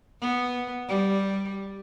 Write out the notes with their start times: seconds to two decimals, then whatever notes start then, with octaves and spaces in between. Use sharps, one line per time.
0.21 B3
0.88 G3